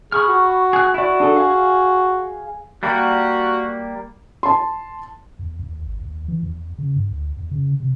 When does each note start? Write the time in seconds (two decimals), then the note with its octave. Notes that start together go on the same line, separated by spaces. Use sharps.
0.12 G#4 B5 C#6 F6
0.28 F#4
0.73 G#4 F#6
0.94 E4 F#4 D5
1.20 D4 G#4 A4
1.36 G#4 F5
2.83 G3 A#3 F#4
4.43 A5 C6
5.39 E2
5.59 D#2
5.86 G#1
6.01 D#2
6.28 E3
6.43 E2
6.78 C#3
6.96 G2
7.11 D2
7.37 E2
7.51 C#3
7.80 C3